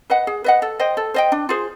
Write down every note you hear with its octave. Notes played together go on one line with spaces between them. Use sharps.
B4 D#5 F#5
G#4
B4 D#5 F#5
A4
C5 D#5 G5
A4
C5 D#5 G5
D4
F4 G#4 C5